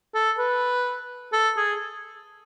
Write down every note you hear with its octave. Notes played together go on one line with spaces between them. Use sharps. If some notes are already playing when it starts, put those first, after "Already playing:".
A4
B4
A4
G#4